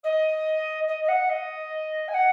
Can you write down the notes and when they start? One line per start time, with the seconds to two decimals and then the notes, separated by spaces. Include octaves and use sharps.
0.03 D#5
0.87 D#5
1.04 D#5
1.08 F#5
1.29 D#5
2.08 G#5
2.13 F#5